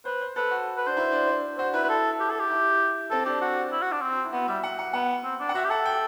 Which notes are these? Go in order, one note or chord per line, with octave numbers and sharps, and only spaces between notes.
B4 C5
C5
A4 B4
F#4
B4
D4 C5
E4
D4
D4
F#4 C5
E4 B4
B4
A4
G4
A4
G4
E4
C4 A4
D4 G4
F#4
E4
F#4
D4
C4
E4
B3 F#4
G3 E5
F#5
F#5
B3 F#5
C4
D4
F#5
F#4 E5
G4
A4 F#5
G5